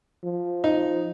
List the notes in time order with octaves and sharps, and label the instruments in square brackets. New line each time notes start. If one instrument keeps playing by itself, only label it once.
[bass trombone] F3
[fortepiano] D#4